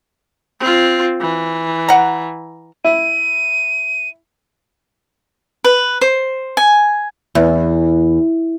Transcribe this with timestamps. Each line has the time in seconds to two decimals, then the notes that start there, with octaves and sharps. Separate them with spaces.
0.61 C4 F4
1.21 E3
1.89 F#5 A#5
2.84 E4 D#7
5.64 B4
6.01 C5
6.57 G#5
7.35 E2